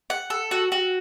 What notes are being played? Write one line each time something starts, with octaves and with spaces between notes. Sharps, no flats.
F#5
A4
F#4
F#4